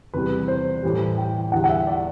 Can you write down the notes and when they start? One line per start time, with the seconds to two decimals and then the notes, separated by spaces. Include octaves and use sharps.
0.14 E2 C3 E3 G3 B4
0.48 C5
0.83 A2 E3 G3
1.18 G5
1.52 E2 D3 G3 F#5
1.64 F#5
1.69 E5
1.87 D5